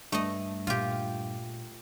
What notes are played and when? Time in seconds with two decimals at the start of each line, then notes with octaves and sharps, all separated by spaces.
0.12 G2 A3 D#5
0.67 A#2 F4 G4